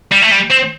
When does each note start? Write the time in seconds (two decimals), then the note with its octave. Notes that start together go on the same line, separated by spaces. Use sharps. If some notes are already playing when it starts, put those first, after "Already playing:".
0.12 G3
0.22 A3
0.31 G3
0.50 C4